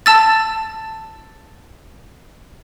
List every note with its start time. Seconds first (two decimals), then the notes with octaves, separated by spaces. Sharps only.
0.06 A5 E6 A6